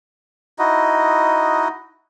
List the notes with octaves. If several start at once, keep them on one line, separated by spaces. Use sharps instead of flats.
D#4 E4 F#4 D#5